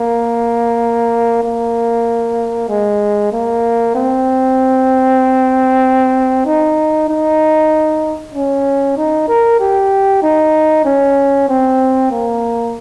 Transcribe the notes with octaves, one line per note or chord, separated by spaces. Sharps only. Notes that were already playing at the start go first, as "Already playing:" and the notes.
Already playing: A#3
A#3
G#3
A#3
C4
D#4
D#4
C#4
D#4
A#4
G4
D#4
C#4
C4
A#3